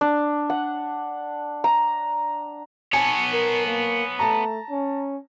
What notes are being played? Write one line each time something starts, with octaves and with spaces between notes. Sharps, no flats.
D4
F#5
A#5
B3 C#5 G#5 A5
A#4
A#3
A3 A5 A#5
C#4